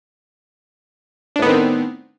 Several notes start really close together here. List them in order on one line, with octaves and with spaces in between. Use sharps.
D4 A2 B3 D#3 C4